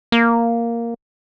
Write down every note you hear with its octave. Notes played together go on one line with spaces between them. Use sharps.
A#3